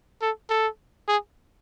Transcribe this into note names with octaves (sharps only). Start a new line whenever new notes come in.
A4
A4
G#4